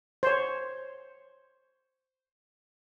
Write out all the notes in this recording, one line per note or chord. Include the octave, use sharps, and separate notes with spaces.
C5 C#5